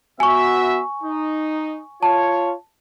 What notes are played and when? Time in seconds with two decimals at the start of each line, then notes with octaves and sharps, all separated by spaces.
0.20 B3 F#4 E5 G#5 C#6
1.03 D#4
2.03 F4 C#5 A5